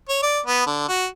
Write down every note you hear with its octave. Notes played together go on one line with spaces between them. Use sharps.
C#5
D5
B3
D3
F#4